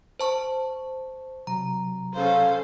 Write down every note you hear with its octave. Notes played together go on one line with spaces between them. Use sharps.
C5 A5 C#6
C3 F#3 A#5
C#4 A4 C5 F5